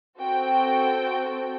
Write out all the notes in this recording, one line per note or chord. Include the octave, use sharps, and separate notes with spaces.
C4 F#4 A4 G5